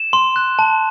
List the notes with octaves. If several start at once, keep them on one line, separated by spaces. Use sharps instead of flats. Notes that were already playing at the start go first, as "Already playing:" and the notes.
Already playing: E7
C6
F#6
A5